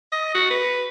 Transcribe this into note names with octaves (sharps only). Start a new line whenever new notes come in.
D#5
F#4
B4